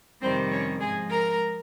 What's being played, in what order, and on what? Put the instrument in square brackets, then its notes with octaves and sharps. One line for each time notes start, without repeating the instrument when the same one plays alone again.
[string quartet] F2 C3 D#3 G3 C4 C5
C#4 C#5
G#2 F3 G#3 G#4 G#5
A#4 A#5